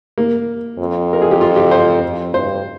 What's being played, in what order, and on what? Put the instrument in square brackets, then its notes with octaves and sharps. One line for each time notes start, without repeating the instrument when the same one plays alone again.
[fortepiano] A#3
[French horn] F2
[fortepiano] A#4
G#4
G4
F4
G4
C5
[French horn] F2
[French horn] G2 [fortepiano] C5